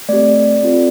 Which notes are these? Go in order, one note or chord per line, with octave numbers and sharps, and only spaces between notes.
A3 C4 G4 D5
C4 F4 A4